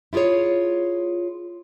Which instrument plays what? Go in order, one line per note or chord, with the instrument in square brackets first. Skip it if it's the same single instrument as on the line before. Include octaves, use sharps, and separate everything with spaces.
[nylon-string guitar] E4 F4 G4 G#4 C#5